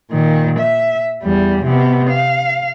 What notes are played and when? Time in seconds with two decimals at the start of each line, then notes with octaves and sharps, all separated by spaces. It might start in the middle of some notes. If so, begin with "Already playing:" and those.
0.11 A#2 D#3
0.59 E5
1.23 E2 G3
1.65 C3 B3
2.10 F5